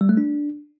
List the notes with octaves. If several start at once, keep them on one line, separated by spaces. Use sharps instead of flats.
G3
A3
D4